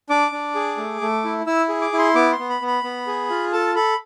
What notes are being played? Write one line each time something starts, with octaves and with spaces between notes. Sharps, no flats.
D4 D6
D4
G#4
A3
A3
E4
E4 E6
G#4
D6
E4
C6
B3 D6
C6
B3
B5
B3
B5
B3
G#4
F4
A4 A5
A4 B5